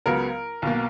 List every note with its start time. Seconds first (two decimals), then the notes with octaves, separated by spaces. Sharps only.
0.06 C#2 C#3 F#3 B3 A#4
0.62 B1 B2 A#3